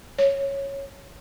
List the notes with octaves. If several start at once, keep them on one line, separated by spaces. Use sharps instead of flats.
C#5